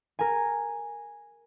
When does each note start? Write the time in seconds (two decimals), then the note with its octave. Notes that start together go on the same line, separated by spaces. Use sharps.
0.19 A#4 G#5